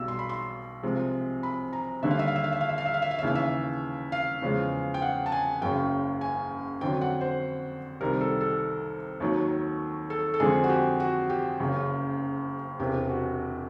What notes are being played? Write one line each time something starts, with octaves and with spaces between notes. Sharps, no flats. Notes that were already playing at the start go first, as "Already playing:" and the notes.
Already playing: B1 B2 G3 E6
C6
B5
C6
C2 C3 F3 G#3
B5
A#5
D#2 D3 G3 E5
F5
E5
F5
E5
F5
E5
F5
E5
F5
E5
F5
E5
F5
E5
D#2 C#3 E3 F5
E5
F5
E2 C#3 F3 G#3
G5
F#5
A5
G#5
F#1 F#2 C#3 G5
G#5
F2 D3 F#3 G5
F#5
C5
C2 C3 D#3 G3 A#4
A4
A4
D#2 D#3 F#3
A4
A4
F2 D3 F3 G#3 G#4
F#4
G4
F#4
G4
F#1 F#2 C#3
E1 E2 C3 G4
F#4